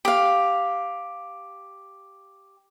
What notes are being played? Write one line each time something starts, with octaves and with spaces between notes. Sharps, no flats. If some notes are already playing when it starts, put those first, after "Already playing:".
G4 F5